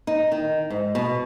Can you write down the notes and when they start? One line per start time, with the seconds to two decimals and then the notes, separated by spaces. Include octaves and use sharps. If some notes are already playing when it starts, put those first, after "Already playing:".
0.07 D#4
0.32 D#3
0.70 G#2
0.95 B2